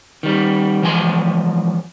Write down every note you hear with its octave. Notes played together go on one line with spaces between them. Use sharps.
D#3 G3
E3 F3 G#3 G#5 A#5 C6